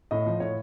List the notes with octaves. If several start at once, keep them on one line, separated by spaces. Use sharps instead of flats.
A2 D#5
F3
A2 C#5